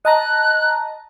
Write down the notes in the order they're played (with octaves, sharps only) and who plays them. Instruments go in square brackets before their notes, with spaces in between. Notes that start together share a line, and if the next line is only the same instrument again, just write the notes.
[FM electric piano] D#5 A5 A#5 [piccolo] F#6